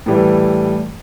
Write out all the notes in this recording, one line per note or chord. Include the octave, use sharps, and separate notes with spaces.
A2 E3 G3